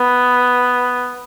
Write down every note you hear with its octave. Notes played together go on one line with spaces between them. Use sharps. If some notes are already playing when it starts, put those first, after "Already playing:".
Already playing: B3